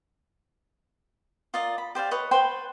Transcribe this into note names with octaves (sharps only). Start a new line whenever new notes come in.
F4 A#4 D5 D#5
B5
G4 C5 D5 F5
B4 C#5 D#5
B4 C5 G5